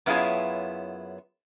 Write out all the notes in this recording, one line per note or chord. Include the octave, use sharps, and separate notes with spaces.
F#2 B3 E4 F4 G#4 C#5